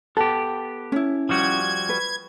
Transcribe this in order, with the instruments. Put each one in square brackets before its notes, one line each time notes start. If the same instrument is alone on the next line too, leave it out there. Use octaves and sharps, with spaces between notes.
[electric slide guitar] B3 G4 [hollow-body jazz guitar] A4
[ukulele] C#4 E4
[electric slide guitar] F3 G3 F#4 [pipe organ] G#6
[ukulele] B4